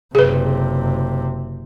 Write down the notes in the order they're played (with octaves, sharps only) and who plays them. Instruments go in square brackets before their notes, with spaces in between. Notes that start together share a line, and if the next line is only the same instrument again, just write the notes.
[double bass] F#1 C3 [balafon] G#4 B4